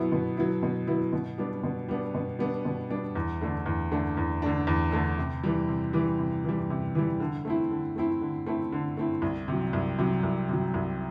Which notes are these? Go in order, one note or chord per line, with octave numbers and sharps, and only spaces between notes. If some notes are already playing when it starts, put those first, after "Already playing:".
Already playing: B2 F#3 B3 E4
B2
F#3 B3 E4
B2
F#3 B3 E4
B2
G3 B3 D4
B2
G3 B3 D4
B2
G3 B3 D4
B2
G3 B3 D4
E2
D3 A3 D4
E2
D3 A3 D4
E2
D3 A3 D4
E2
D3 A3 D4
C3
E3 G3
C3
E3 G3
C3
E3 G3
C3
E3 G3
D3
A3 C4 E4
D3
A3 C4 E4
D3
A3 C4 E4
D3
A3 C4 E4
C2
C3 F#3
C2
C3 F#3
C2
C3 F#3
C2